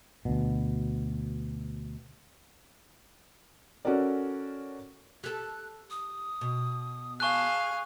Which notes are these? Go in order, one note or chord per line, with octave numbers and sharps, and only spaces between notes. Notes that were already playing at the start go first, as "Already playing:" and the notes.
D2 B2
C#4 F#4 A4 A#4 D5
G4 A4 F#6
D#6
B2
G#4 F5 A5 C#6 F#6